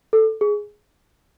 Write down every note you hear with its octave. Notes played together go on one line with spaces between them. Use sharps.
A4
G#4